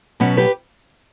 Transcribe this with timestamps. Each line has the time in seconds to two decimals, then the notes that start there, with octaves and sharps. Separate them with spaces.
0.20 B2 F#3 B3 C#4
0.37 G4 B4